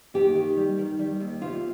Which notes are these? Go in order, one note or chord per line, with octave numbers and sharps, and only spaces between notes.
D#2 G4
D#3
G3
D#3
G3
D#2
C3 F4